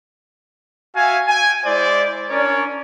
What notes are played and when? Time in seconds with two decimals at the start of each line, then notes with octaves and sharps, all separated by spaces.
0.95 F#4 E5 F5 G#5
1.28 G5 G#5
1.65 G#3 E4 C5 D5
2.29 C#4 D4 A#4 C#5 D5